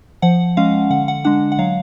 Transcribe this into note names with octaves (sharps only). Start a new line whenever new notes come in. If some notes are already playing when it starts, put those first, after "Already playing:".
F3 F#5
G#3 C#4 F5
D3 F#5
F#5
G#3 D4 F#5
F#5
F#3 F5